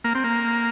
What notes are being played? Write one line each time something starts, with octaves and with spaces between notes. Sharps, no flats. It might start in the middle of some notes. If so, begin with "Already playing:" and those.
A#3
C4
A#3